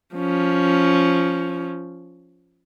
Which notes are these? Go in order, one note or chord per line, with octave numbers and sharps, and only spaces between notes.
F3 C#4